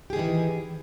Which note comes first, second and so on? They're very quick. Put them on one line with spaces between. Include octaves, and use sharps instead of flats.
G4 G#4 D#3 E3